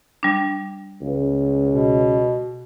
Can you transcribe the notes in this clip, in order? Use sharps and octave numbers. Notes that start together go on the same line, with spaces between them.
G3 D4
C#2
B2